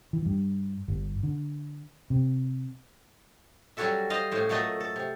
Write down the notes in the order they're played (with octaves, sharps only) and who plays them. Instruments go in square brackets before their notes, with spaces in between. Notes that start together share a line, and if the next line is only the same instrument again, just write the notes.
[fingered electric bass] E3
G2
G1
D3
C3
[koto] F#3 G3 C#4 F#4 A4 E5
C5 D#5 F5
A2 C#4 C5
A#2 F#3 A3 A4 D#5
A4
C3